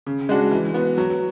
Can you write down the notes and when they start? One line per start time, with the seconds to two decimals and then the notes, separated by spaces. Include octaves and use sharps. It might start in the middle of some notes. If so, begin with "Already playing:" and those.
0.07 C#3
0.29 G#3 D4 F#4
0.51 E3
0.74 B3 F#4
0.98 F#3